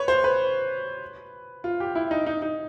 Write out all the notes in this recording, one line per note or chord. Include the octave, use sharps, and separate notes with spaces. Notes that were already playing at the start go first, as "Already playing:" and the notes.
Already playing: B4 C#5
C5
B4
F4
G4
E4
D#4
D#4
D#4